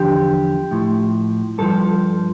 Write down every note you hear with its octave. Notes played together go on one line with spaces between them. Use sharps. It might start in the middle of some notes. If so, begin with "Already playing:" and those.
Already playing: E2 D3 F3 G4
A2 F3
G2 F3 A4